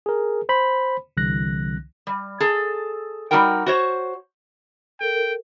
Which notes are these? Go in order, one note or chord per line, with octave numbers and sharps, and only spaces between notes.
G#4 A#4
C5 B5
C2 D3 E3 F#6 A#6
G3
G#4 A4
G3 A#3 D#4 F#4 A#4 G5
F#4 C5 C#5
A4 A#4 G5